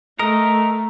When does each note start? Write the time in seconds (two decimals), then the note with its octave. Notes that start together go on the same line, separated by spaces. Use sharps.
0.19 A3 A#4 D#5 A#5